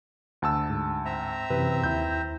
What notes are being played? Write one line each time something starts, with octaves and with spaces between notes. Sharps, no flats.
D2 A5 E6
G#2
C4 E5 A#5
F#2 C3 E3 B4
D#2 E4 G6